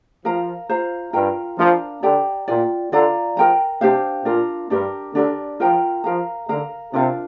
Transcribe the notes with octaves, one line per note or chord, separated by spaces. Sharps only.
F3 A#4 F5 A#5
F4 C5 F5 A#5
G2 F4 A#4 G5 A#5
F3 D4 A#4 F5 A#5
D3 G4 D5 G5 A#5
A#2 F4 D5 G5
D3 F4 D5 F5 A#5
F3 A#4 G5 A#5
C3 D4 G4 C5 F5
A#2 D4 F4 A#4
G2 D4 G4 A#4
D3 D4 G4 A#4 D5
F3 F4 A#4 G5 A#5
F3 A#4 F5 A#5
D3 A#4 F5 A#5
C3 D4 F4 A#4 F5